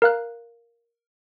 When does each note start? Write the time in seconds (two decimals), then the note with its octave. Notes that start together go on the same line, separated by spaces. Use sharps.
0.02 A#4 F5 F#6